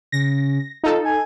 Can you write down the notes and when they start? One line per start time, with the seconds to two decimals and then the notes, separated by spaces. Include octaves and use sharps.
0.12 C#3 A#6
0.84 D#4 F4 A4
1.05 G#5